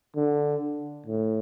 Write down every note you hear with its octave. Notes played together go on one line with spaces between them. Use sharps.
D3
A2